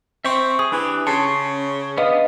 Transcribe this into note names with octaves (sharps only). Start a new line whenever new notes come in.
C4 E5 C#6
G#4 D#6
E3 D4 G4
C#3 C#4 A5 C6 C#6
B3 D4 B4 D#5 F5 D#6